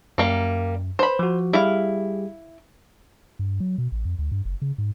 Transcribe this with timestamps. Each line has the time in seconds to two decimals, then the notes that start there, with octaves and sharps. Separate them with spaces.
0.18 F#2 G3 A#3 A#5
0.99 B4 C5 B5
1.19 F3 F#4
1.53 G3 E4 G4 G#4 F5
3.39 G2
3.60 F#3
3.78 B2
3.92 A1
4.05 F2
4.19 D2
4.32 G2
4.45 F#1
4.62 C#3
4.78 G#2